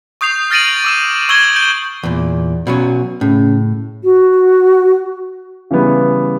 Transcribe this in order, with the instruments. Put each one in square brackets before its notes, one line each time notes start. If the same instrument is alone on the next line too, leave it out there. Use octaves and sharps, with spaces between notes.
[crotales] C#6 D#6 G6 C7 F7
F6 A6 A#6 D7 D#7 F#7
D6 E6 E7
C#6 E6 G#6 E7 G7
G6 D7
[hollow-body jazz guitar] E2 A#2
B2 F#3 C#4
[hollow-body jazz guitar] A2 [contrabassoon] C#3
[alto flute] F#4
[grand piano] C#3 E3 G3 B3